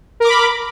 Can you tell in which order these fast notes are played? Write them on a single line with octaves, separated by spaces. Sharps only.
A#4 D6 B5